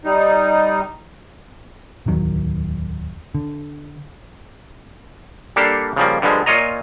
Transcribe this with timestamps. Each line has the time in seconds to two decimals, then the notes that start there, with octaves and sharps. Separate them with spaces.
0.05 G3 D#4
2.06 D1 E2 D#3 F#3
3.35 D3
5.56 G3 A#3 D4 G4 A4 F5
5.96 C#3 F3 G3 A#3
6.22 G2 D3 F3 G3 G#3
6.46 A#2 F4 C#5 D#5 A#5